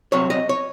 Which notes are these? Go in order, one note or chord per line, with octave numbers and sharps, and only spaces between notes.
C2 C3 F#3 C#5
D#5
C#5